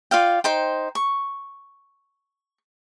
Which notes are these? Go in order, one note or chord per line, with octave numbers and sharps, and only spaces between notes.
F4 D5 F5 G5
D#4 C5 G5
C#6